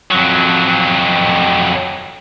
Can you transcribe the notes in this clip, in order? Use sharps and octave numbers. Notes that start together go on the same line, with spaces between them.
F2 F#3